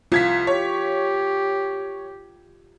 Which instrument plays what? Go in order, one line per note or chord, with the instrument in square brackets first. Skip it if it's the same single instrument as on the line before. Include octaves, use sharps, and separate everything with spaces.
[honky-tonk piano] C2 G#6 B6 [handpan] F4
[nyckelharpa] G4 [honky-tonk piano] C#5